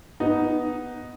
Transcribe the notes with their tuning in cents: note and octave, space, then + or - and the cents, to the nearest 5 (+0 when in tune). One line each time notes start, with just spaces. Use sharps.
B3 +0 D#4 +0